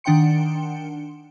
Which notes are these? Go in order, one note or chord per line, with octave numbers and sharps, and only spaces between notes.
D#3 D4 F#5 G5 C6 C#7